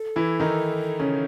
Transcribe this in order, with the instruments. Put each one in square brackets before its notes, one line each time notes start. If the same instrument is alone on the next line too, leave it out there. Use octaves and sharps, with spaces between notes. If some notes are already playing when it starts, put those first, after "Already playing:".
Already playing: [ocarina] A4
[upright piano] E3 E4
D#3 D#4
C#3 C#4